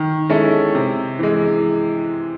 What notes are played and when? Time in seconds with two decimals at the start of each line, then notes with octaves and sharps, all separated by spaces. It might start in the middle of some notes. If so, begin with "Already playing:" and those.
Already playing: D#3
0.29 G#3 C#4 E4 A4
0.75 C3
1.19 E3 G#3